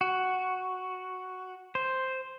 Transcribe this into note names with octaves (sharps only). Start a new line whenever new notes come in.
F#4
C5